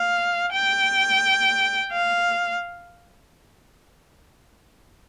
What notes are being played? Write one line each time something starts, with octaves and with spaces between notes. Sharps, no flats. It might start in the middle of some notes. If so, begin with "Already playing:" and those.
Already playing: F5
G5
F5